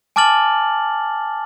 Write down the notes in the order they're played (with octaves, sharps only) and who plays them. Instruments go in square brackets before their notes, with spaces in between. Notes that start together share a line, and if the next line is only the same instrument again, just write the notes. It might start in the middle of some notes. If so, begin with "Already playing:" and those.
[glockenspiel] G#5 A5 D6 F6 A6 F#7